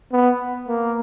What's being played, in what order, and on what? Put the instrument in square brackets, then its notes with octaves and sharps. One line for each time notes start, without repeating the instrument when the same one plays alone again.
[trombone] B3
A#3